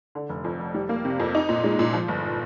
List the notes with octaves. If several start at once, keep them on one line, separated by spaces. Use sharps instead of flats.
D3
F1
F2
F1
G3
A#3
C3
F2
D#4
A#2
G#3
A#2
F3
G1